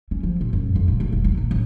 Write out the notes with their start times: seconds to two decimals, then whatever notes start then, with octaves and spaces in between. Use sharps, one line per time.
0.11 C#4
0.23 F3
0.41 A#2
0.53 F#2
0.75 F2
0.88 A#2
1.00 A3
1.12 F1
1.24 E2
1.37 A#2
1.51 A1